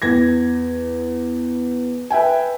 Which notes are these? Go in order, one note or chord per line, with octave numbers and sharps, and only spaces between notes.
E2 G#6 A#6
B4 E5 G5 G#5